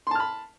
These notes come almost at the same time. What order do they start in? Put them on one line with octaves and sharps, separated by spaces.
C6 A5 F6 B5